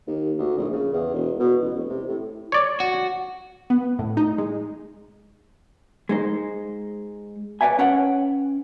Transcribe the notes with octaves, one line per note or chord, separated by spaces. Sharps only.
D#2
D2
A#1
C#3
E2
E1
B2
A1
E1
C3
A2
C#5 D5
F#4
B3
A2
D#4
G#3
G#3 D#4 C5
B4 C#5 D5 E5 G#5
C#4 B4 C#5 E5 F#5 G5